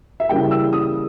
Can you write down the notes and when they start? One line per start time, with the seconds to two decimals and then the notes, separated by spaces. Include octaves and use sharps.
0.20 E5
0.29 C#3 E3 G3 A#3 G5
0.51 E6
0.73 D#6